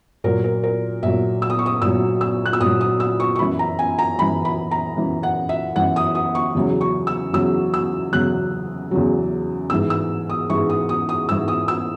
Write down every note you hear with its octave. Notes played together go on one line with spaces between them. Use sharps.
A#2 F#3 A#4
A#4
A#4
A#2 F#3 E5
E6
D#6
C#6
D#6
A#2 F#3 E6
E6
F#6
E6
A#2 D#6
F#3
D#6
E6
C#6
C#6
F#2 E3 B5
A#5
G#5
A#5
F#2 E3 B5
B5
A#5
F#2 E3
F#5
E5
F#2 E3 F#5
D#6
D#6
C#6
E2 C#3 F#3
C#6
E6
E2 C#3 F#3 E6
E6
E2 C#3 F#3 F#6
E2 C#3 F#3
G#2 E3 E6
E6
D#6
G#2 E3 C#6
D#6
D#6
D#6
G#2 E3 E6
D#6
E6